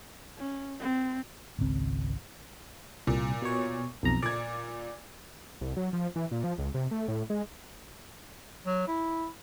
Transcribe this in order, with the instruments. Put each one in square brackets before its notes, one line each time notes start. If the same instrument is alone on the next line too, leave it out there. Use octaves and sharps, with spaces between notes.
[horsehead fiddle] C#4
C4
[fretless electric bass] G#1 C#2 C4
[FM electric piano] C2 [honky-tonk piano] A#2
[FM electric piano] B2 C#5
B1 F2 A#5
[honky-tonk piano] A#2 G#6 [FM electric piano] D5
[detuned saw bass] C2
F#3
F3
E3
A#2
F3
C#2
C3
A3
A2
G#3
[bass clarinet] F#3
E4